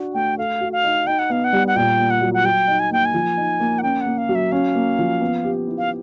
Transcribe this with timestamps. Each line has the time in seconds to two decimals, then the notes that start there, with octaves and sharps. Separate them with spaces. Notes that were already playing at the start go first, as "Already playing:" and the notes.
Already playing: D4 F#4
0.14 A3 G5
0.38 A4 F5
0.61 F#4
0.73 F5
0.84 D#4
1.07 D#4 G5
1.19 F#5
1.30 B3 F5
1.44 F#5
1.53 G3
1.68 F#5
1.76 A#2 G5
1.99 A#3
2.10 F#5
2.22 F#3
2.34 F#5
2.45 F#3 G5
2.68 D#4
2.80 G#5
2.91 A#3 G5
3.05 G#5
3.14 F3
3.37 D#4
3.60 A#3
3.79 F#5
3.83 C#4 G5
4.01 A#3 F#5
4.18 F5
4.29 F#3
4.35 E5
4.52 C#4 F5
4.75 A#3
4.99 F3
5.21 B3
5.44 G4
5.67 E4
5.78 F5